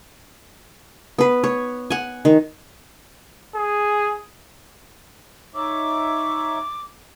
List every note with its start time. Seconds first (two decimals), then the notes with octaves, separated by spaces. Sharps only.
1.18 B3 B4
1.44 C#5
1.90 F#5 G#5
2.25 D#3
3.55 G#4
5.55 D#4 C#5 E5 D6